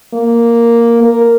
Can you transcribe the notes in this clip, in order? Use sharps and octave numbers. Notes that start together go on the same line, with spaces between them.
A#3
A#4